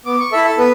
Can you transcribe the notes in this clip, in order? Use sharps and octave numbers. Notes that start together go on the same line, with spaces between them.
B3 D6
C#6
E4 A4 E5
A4
B3 B4